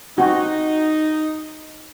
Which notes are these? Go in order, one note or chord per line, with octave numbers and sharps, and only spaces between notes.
C4 D#4 F#4